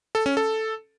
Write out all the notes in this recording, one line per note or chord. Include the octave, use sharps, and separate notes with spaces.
A4
C#4
A4